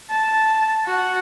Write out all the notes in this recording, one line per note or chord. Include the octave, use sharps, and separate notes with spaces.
A5
F#4